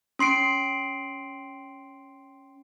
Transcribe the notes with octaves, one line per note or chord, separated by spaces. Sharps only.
C#4 C6 C7 D7